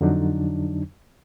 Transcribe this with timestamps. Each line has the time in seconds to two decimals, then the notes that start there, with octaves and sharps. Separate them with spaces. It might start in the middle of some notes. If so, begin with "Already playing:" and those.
0.01 F2 D3 F#3 D4 D#4